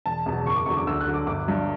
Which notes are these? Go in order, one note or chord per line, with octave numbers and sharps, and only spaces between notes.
E1 A5
E2 B2 F#3
F#1 C#6
D6
E2 D3 F#3 C#6
D6
D2 E6
F#6
D3 F#3
D6
G1 D6
G2 F#3